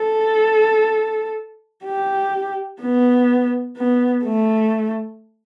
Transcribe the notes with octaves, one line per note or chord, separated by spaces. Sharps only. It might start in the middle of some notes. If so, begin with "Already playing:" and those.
Already playing: A4
G4
B3
B3
A3